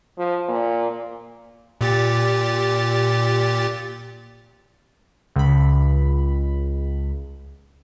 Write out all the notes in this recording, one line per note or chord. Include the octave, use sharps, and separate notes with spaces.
F3
A#2
A#2 G4 A6
C#2 B5